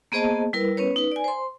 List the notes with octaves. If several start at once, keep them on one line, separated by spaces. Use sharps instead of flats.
A#3 B3 G#4 C5 D#5 A5
G3 E4 A#4 B4
B3 C#4 B4 C#5
D#4 B4
D5 G#5
C5 C6